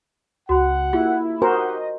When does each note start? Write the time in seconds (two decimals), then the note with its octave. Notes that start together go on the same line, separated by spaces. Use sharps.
0.49 C#2 F#4 F#5 B5
0.93 A#3 E4 F4 G4
1.42 D#4 F#4 G4 A#4 C5 D#5 F#5 G#5